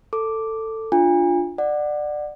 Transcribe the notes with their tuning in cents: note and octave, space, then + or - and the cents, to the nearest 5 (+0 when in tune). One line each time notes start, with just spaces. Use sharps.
A4 +15 D6 +0
D4 +0 F4 +0 G#5 -40
D5 +25 F#5 +0